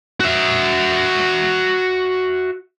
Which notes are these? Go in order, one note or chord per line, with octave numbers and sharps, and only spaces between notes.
F#4 E5